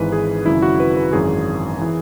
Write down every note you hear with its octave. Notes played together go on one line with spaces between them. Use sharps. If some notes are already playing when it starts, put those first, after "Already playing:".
Already playing: G#1 G#2 E3 B4
G#4
G#1 F#2 C#3 E4
F#4
B4
B4
G#1 F#2 E3 G#4
E3